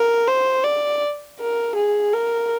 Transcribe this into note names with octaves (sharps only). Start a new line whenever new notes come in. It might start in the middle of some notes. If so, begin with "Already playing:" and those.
Already playing: A#4
C5
D5
A#4
G#4
A#4